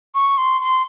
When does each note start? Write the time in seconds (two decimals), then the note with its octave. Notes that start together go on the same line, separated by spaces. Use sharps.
0.15 C#6
0.38 C6
0.61 C6